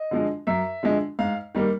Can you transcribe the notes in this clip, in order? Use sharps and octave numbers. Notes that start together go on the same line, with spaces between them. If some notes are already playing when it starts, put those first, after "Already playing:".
Already playing: D#5
D3 F3 G#3
F#2 E5
D3 F3 G#3
G#2 F5
D#3 G3 A#3